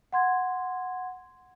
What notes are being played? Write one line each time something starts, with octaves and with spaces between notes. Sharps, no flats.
F#5 C6 G#6